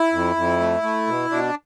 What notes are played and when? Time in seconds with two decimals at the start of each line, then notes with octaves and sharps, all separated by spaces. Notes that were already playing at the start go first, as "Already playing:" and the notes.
Already playing: E4
0.13 F2
0.36 F2
0.60 A3
0.83 A3
1.07 B2
1.30 B2 D4